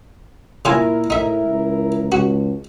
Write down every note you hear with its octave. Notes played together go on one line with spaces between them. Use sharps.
A#2 C#3 E4 F4 A#4 G#5
A2 D#4 E5
C#2
C#2 F#4